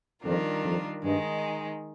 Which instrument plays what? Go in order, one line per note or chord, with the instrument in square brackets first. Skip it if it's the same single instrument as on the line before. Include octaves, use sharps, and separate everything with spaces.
[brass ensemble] F2 [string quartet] D#3 G3 D4 F4 A#4
[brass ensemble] F2
[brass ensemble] G2 [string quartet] D#3 G#3 D#4